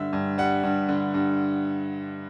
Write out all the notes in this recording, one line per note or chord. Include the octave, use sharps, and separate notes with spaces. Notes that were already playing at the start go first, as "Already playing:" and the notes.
Already playing: G2 D3 E5
G2
G3 F#5
G2
D3
G2